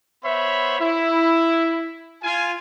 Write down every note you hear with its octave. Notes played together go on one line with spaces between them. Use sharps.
B3 C5 C#5 E5 B5
E4
F4 G#5